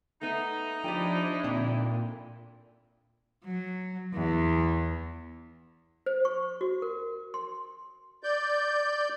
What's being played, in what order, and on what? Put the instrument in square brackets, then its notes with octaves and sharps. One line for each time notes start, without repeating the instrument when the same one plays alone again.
[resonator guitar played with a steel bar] A3 B3 [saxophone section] D#4
[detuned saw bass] F3 [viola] D4 E4 [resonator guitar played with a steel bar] G4 D5 G5
[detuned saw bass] A#2 [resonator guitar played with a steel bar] D3 C4
[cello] F#3
E2
[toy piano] C5
C#6
F#4
A#4
C6
[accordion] D5 G6